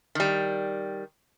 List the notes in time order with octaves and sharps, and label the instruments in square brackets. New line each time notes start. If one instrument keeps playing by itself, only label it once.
[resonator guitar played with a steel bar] D#3 G3